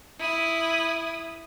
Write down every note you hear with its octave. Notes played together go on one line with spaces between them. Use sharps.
E4 D#6